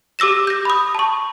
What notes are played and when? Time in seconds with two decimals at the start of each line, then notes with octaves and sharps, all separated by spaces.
0.19 G4 D6 E6 A#6 E7
0.47 G6 A#6
0.65 B5 D#6
0.95 A5 C#6